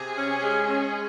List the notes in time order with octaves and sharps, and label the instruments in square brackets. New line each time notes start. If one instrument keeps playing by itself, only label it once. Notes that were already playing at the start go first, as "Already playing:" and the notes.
Already playing: [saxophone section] C3 [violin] G#4
[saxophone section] C#4
G#3
C#4
G#3